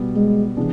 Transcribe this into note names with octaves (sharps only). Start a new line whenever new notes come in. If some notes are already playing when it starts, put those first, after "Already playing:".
Already playing: B2 G3 B3
G#3
C3 E3 G#3 B3 D4